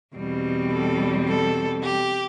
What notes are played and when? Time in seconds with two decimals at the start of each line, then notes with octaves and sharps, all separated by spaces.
0.15 E2 B2 G3 C4
0.72 A4
1.28 A4
1.83 G4